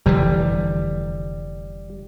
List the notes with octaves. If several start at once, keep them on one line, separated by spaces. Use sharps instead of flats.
F1 D3 E3 G3